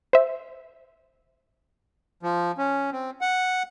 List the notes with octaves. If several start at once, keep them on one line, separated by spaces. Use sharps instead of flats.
C5 E5
F3
C#4
C4
F#5